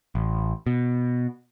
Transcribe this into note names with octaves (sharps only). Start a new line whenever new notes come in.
A1
B2